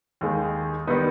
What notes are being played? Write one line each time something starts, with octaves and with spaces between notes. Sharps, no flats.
D#2 D#3 G#3
D#3 G3 B3 D#4